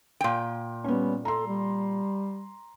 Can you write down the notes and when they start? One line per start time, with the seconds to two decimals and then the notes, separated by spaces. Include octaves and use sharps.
0.21 A#2 G5
0.84 G3 B3 C#4
1.25 A4 A#5 C6
1.47 G3